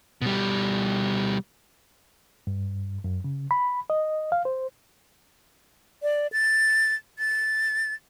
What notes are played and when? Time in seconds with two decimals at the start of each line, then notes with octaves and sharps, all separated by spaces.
0.22 B2 G3
2.47 G2
3.04 F#2
3.24 C#3
3.51 B5
3.90 D#5
4.32 F5
4.45 C5
6.03 D5
6.32 A6
7.19 A6